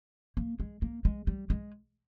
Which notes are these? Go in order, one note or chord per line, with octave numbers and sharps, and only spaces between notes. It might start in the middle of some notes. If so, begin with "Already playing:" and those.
A#3
G#3
A#3
G#3
G3
G#3